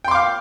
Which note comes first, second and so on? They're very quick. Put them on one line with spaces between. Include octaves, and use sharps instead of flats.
G5 C6 D6 F5